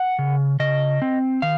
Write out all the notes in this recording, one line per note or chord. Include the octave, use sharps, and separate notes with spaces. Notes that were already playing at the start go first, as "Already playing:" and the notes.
Already playing: F#5
C#3
C#3 D#5
C4
D#3 F5